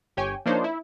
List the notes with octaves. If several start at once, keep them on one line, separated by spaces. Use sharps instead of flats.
G1 G4 C#5 G5 G#5
F3 A#3 D4 D#4 C5 C#5
E4